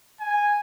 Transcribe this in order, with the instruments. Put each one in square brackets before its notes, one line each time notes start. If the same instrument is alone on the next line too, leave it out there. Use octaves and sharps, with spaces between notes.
[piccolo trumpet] G#5